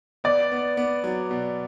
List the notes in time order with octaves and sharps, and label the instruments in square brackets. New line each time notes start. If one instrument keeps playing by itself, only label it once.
[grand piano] B3 [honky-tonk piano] D5
[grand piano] B3
B3
F#3
B2